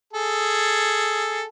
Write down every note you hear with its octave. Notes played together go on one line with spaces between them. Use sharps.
G#4 A4